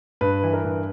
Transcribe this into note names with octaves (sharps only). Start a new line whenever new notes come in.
G2 B4
E3
A#4
G2